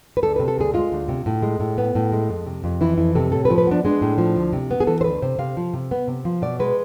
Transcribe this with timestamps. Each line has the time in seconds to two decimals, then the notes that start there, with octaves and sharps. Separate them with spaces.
0.17 B4
0.22 D2 A4
0.36 C3 B4
0.48 A4
0.58 D2 G#4
0.74 G#3 F4
0.92 D2
1.09 C3
1.26 A2
1.43 G#3
1.60 A2
1.78 B3
1.95 A2
2.12 G#3
2.29 F2
2.46 C3
2.64 F2
2.81 E3 E4
2.98 F2 E4
3.15 C3 A4
3.32 A2 A4
3.45 B4
3.50 F3
3.58 B4
3.67 B3 D4
3.85 G#3 D4
4.02 A2
4.18 F3
4.36 D2
4.53 C3
4.71 B3
4.80 G#4
4.87 E3 A4
5.01 C5
5.04 D2 B4
5.22 C3 C5
5.39 C3 F5
5.57 F3
5.74 C3
5.91 B3
6.08 C3
6.25 F3
6.42 B2 D5
6.60 G#3 B4